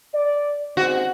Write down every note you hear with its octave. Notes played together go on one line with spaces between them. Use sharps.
D5
D#2 G#2 C4 F#4